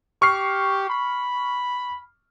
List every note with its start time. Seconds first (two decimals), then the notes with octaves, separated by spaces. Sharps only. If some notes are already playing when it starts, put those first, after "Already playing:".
0.22 G4 C#6 F6 C7
0.90 B5